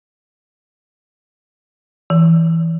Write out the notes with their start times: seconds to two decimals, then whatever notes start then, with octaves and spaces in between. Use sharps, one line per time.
2.10 E3